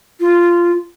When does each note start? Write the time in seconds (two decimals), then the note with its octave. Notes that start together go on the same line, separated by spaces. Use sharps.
0.20 F4